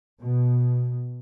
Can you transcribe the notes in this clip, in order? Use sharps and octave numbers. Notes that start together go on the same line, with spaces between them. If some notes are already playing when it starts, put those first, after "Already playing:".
B2